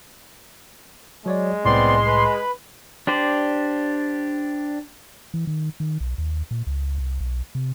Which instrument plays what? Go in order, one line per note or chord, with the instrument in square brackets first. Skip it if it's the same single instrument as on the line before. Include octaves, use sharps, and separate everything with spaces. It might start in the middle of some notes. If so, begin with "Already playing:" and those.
[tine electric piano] F#3 C#5 D5 [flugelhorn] G#3
[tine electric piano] C2 A2 [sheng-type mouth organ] B3 C4 D5 [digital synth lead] C6
[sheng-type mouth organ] B4 B5
[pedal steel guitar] D4 G4 C5 D5
[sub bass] E3
D#3
D#3
B1
D#2
A#2
C#2
C2
B1
C3